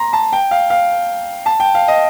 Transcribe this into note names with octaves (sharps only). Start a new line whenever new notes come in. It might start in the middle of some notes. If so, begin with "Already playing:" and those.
Already playing: A#5 C6
A5
G5
F5
F5
A5
G5
F5
D#5